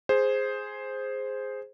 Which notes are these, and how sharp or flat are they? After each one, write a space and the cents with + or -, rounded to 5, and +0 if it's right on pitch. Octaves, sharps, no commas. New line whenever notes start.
G#4 +0 C5 +0